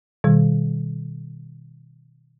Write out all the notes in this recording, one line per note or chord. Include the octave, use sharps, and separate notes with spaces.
B2 D#3 G3